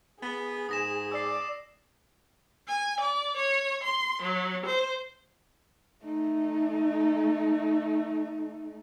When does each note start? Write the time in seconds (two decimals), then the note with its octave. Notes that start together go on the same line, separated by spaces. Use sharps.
0.23 B3 G#4
0.69 G#2 D#6 A#6 E7
1.12 D5 E6 C7
2.68 G#5
3.01 D5
3.37 C#5
3.84 C6
4.22 F#3
4.66 C5
6.04 A3 D#4